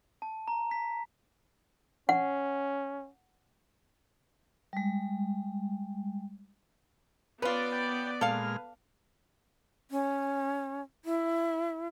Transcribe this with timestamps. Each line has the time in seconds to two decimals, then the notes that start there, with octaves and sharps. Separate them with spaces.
0.22 A5
0.48 A#5
0.71 B6
2.09 C#4 F#5
4.73 G3 G#3
7.42 B3 C#4 F4 B4 D5
7.72 G5
8.21 A#2 G#3 A4 F5 F6
9.91 C#4
11.05 E4